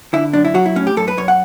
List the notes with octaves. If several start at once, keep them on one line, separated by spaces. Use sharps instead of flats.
D3 E4
F#2 D4
E4
F#3 F#4
E4
A2 C#4
G4
F#2 A4
B4
F#2 C#5
F#5